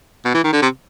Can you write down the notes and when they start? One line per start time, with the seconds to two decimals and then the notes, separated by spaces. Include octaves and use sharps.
0.25 B2
0.34 E3
0.44 D#3
0.53 D3
0.62 C3